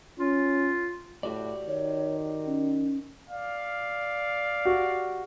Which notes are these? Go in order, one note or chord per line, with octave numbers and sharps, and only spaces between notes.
C#4 F4
A2 F#4 G4 D5
D#3 C#5
C#4
D5 F5
F#4 G4